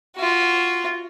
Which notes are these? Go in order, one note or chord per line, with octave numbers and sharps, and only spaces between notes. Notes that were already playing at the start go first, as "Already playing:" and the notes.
F4 F#4